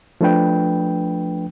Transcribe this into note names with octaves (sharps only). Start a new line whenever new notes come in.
F3 A3 D4 B4 G5